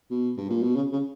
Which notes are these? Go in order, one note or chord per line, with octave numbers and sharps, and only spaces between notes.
B2
G2
A#2
B2
C#3
C#3